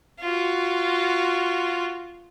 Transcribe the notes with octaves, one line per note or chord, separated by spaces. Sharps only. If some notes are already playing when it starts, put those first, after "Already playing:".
F4 F#4